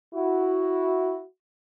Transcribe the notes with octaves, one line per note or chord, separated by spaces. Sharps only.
E4 F#4